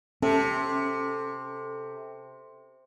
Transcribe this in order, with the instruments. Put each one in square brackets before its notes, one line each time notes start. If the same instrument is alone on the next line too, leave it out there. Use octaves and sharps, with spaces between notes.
[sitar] C3 [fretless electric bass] C#4 [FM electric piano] A4